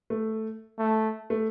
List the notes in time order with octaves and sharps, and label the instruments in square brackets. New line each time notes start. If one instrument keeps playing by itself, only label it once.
[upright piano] A3
[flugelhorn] A3
[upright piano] A3